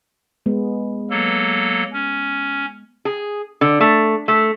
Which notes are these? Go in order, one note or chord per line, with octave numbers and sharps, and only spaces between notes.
G#3 B3
F#3 A#3 A4
C#4
G#4
D3
A3
A3